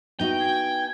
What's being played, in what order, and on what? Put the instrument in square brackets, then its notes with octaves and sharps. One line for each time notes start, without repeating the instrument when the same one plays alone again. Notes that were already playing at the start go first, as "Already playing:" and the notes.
[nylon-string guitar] B3 D#4 F#4 [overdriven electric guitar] G5
[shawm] G#5